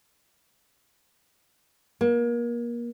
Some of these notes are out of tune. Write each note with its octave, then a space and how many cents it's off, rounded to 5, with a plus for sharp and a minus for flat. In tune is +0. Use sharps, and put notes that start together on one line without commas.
A#3 +30